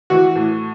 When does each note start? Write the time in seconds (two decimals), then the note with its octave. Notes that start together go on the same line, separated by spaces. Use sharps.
0.10 E3 F#4
0.36 A2